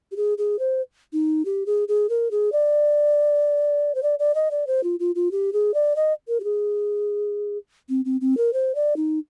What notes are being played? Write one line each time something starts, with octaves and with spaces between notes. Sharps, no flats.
G4
G#4
G#4
C5
D#4
G4
G#4
G#4
A#4
G#4
D5
C5
D5
D5
D#5
D5
C5
F4
F4
F4
G4
G#4
D5
D#5
A#4
G4
G#4
C4
C4
C4
A#4
C5
D5
D#4